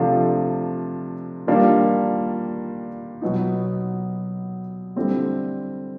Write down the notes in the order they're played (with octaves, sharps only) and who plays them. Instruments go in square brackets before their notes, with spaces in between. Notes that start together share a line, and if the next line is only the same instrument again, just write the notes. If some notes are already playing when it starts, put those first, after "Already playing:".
Already playing: [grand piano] C3 F3 A3 D4 F4
D#3 G3 A#3 D4 F4
B2 F#3 B3 D#4
D3 G3 C4 E4 A4